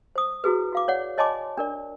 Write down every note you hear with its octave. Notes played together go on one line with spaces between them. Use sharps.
C5 D#6
E4 F#4 G#4 B4
F#4 F5 D6
C#5 D5 F#5
C#5 D#5 G#5 A5 C6 D6
D4 A#4 D5